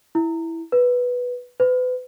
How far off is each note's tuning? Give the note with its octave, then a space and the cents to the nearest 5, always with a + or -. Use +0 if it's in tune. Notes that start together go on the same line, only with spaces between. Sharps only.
E4 +0
B4 -5
B4 +35